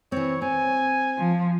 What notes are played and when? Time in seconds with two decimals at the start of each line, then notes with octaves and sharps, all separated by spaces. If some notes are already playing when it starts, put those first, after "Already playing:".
0.12 E3 C4 C#5
0.42 C4 G#5
1.18 F3